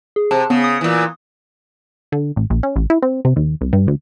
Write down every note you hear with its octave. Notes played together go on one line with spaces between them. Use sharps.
G#4
C3 A5
C#3 B3
D#6
A#2 E3
D3
A1
A#1
C#4
A1
E4
C4
C3
D#2
C2
G2
D2